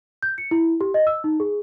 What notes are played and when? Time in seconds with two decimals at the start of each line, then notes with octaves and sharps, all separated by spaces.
0.23 G6
0.38 C#7
0.51 E4
0.81 G4
0.94 D#5
1.07 E6
1.24 D#4
1.40 G#4